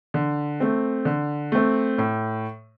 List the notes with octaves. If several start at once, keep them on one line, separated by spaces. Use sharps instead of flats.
D3
A3 C4
D3
A3 C4
A2